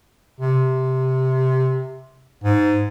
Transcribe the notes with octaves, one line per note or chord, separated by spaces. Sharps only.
C3
G#2